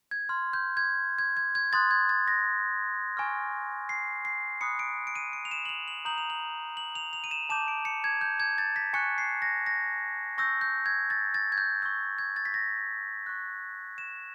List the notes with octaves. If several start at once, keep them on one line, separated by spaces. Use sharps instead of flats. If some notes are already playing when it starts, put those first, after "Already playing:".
G#6
C6 F6
G6
G#6
G#6
G#6
G#6
C6 D#6 F#6 A6
G#6
A6
A#6
G#5 C#6 F6
C7
C7
B5 D#6 F#6 C#7
D7
D7
D#7
D7
F7
E7
F#7
F7
F#7
A#5 D#6 G6 F#7
F7
F#7
F#7
F7
F7
D#7
E7
A5 D6 G6 E7
D7
C#7
G#6
G6
G#6
A6
B6
G#5 C#6 F#6 C#7
C7
A#6
A#6
C#6 E6 G6 A#6
G6
G#6
A6
A6
G#6
G6
C#6 E6 G6
G#6
A6
B6
A#6
C#6 F#6
E7